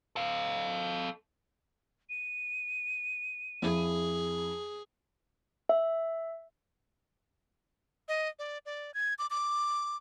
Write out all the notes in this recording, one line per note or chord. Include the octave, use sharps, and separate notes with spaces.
A4 F5
D#7
F2 E4 G#4
E5
D#5
D5
D5
G#6
D6
D6